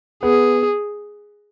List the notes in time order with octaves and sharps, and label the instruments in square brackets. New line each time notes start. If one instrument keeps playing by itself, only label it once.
[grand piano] B3 [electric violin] G#4